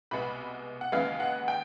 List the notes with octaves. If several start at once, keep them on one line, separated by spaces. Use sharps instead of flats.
C2 B2 G#3 B3 B5
F#5
D#2 C#3 E3 G#3 B3 F5
F#5
G5